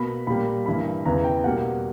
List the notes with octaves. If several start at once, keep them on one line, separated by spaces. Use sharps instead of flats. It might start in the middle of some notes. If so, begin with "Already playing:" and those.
Already playing: B2 A#3 B5
A#2 G3 A#3 B5
G2 E3 A#3 B5
E2 C#3 E3 B3 A#5
G5
B2 G3 A#3 F#5